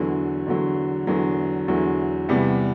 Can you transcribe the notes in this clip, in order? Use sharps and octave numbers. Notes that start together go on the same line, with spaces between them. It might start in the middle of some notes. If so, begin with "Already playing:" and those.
Already playing: E2 D3 F#3
E2 D3 F#3
E2 D3 F#3
E2 D3 F#3
E2 C3 G3 B3